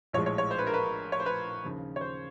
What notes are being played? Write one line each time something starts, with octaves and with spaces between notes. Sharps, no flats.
A#1 A2 F3 G#3 C#5
C#5
C#5
C5
B4
A#4
B4
C#5
C5
B4
D#2 C#3 F3
C#5
C5